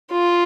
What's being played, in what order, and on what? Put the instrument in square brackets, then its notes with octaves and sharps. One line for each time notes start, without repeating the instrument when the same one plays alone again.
[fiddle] F4